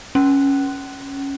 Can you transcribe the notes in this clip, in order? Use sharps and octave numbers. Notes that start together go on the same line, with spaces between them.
C#4